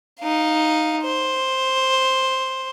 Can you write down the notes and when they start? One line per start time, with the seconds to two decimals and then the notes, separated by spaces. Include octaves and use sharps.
0.21 D#4 F5
1.02 C5